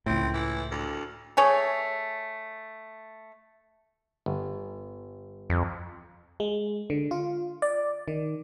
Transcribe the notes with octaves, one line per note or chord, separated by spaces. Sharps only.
C#2 A2 C4
E3
D2
A3 G#4 C#5
G1
F2
G#3
D3
F4
D5
D#3